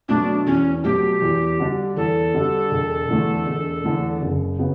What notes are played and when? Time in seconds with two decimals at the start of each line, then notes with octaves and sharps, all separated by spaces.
0.09 B2 F#3 A3 D4
0.47 E2 C#4
0.84 B2 F#3 A3 G4
1.22 E2
1.59 D3 G3 D4
1.97 E2 A4
2.34 D3 G3 D4
2.71 E1
3.09 E2 D3 A3
3.47 E1
3.84 E2 D3 A3
4.22 F#1
4.59 C#3 B3